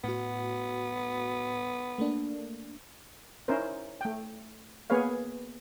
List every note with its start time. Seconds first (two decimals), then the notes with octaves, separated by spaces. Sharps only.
0.04 A2 B3 F#4
1.98 A3 A#3 D4
3.48 C#4 D#4 E4 A#4 C5
4.01 A3 G5
4.90 A#3 B3 G#4 B4 C#5 F5